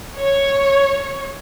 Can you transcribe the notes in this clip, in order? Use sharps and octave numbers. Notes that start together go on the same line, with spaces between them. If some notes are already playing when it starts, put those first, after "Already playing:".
C#5